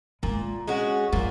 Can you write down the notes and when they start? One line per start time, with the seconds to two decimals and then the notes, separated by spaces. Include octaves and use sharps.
0.23 A#2 G#3
0.68 G#3 C#4 F#4
1.13 A#2 F#3